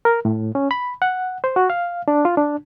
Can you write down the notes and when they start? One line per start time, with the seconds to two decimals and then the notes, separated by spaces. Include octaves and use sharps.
0.05 A#4
0.25 A2
0.55 C#4
0.71 B5
1.02 F#5
1.44 C5
1.56 F#4
1.70 F5
2.08 D4
2.25 F4
2.37 D4